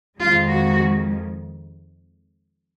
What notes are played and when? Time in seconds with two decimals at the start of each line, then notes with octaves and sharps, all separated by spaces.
0.21 F2 D#3 G#3 F4
0.50 F#4